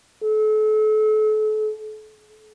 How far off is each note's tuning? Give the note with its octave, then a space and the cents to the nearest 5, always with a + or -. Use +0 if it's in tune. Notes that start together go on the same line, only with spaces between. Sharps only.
A4 -35